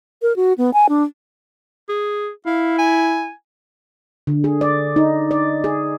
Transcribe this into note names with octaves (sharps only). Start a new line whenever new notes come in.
A#4
F#4
B3
G#5
D4
G#4
E4 F5
G#5
D3
G#4
D5
D#4
D5
G#4